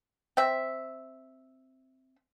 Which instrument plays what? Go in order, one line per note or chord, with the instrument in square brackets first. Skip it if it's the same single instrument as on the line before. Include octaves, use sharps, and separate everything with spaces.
[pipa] C4 E5